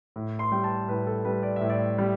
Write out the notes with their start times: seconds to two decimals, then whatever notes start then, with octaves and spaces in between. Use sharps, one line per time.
0.16 A2
0.39 C6
0.52 G3 G5
0.64 A5
0.88 A2 B4
1.07 A4
1.25 G3 B4
1.43 D5
1.56 A2 E5
1.70 D5
1.98 G3